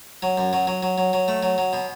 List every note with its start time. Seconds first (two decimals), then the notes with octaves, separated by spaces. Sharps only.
0.22 F#3
0.38 F#2
0.53 F#3
0.67 F#3
0.83 F#3
0.98 F#3
1.13 F#3
1.28 A3
1.43 F#3
1.58 F#3
1.73 B2